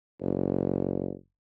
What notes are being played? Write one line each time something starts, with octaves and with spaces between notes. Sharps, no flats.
F#1